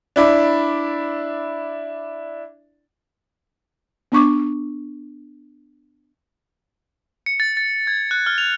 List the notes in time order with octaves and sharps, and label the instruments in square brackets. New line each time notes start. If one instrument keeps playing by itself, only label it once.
[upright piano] D4 E4 D5
[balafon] B3 D4 C#6 D6
[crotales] C#7
A6
A6
G#6
F#6
F6
F7